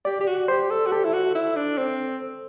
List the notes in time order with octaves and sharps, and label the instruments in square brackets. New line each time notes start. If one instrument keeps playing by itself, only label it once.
[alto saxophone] G4 [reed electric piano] D5
[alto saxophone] G4
F#4
[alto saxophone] G4 [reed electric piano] C5
[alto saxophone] A4
F#4
[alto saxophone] G4 [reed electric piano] A4
[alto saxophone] E4
F#4
E4
D4
C4